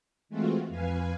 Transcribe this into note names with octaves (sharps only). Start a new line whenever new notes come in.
E3 G#3 A3 C4 F4 F#4
F2 B4 F5 G#5